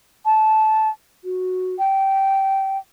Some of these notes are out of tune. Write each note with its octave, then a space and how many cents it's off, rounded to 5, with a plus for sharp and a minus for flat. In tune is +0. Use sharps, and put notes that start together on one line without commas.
A5 -15
F#4 -5
G5 -15